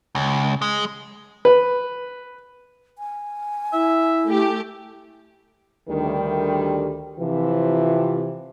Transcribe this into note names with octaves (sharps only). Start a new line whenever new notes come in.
C#2
G#3
B4
G#5
E4 E5
A3 G4
D2 D#3 G3
C3 E3 F3